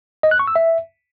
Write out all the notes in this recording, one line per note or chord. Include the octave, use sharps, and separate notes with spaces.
D#5
F#6
C#6
E6
E5